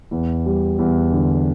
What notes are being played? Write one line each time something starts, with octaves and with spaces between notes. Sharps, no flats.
E2
G3
E2
D3